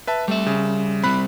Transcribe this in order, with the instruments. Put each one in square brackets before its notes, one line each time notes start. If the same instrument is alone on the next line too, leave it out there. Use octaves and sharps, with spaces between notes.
[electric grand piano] B4 E5 A5
[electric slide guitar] G3 E5 [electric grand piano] A3
[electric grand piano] C#3
[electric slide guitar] G3 C4 [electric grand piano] B5 F#6